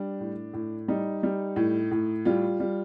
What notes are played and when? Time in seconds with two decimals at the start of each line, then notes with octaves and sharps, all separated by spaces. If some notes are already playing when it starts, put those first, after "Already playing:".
Already playing: G3 D4
0.20 A2
0.54 A2
0.88 G3 D#4
1.23 G3
1.56 A2
1.91 A2
2.25 G3 F4
2.60 G3